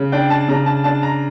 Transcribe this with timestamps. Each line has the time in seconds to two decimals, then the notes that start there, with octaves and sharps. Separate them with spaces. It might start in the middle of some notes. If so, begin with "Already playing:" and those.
Already playing: C#3
0.12 D4 G5
0.30 A5
0.48 C#3 A#5
0.66 A5
0.84 D4 A5
1.03 A#5